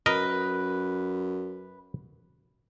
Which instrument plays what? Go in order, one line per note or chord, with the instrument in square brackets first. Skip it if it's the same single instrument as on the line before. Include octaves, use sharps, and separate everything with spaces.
[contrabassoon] F#2 [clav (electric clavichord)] A#4 D#5 [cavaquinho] B4